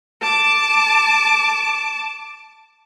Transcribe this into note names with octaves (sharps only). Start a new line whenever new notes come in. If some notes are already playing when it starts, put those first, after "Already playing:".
A5 D6